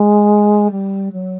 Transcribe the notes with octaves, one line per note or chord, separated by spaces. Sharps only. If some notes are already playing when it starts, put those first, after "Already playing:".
Already playing: G#3
G3
F#3